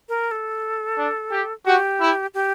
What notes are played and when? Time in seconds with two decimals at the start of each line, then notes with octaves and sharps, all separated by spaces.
0.09 A#4
0.31 A4
0.98 D4
1.32 G4
1.65 F#4 G4
2.00 E4
2.34 G4